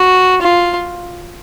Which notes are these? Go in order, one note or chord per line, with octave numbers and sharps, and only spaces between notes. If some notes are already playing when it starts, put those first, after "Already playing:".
Already playing: F#4
F4